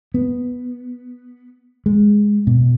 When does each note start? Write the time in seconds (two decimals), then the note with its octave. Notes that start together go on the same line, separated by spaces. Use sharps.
0.14 B3
1.86 G#3
2.47 B2